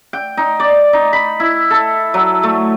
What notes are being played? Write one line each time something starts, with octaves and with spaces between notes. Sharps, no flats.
G5
D#4
D5
D#4
B5
E4
A4
F#3
A3